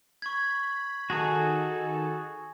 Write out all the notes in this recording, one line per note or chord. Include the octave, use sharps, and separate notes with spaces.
B5 C#6 G#6
D#3 D#4 F#4 G#4 A4 G#5 A5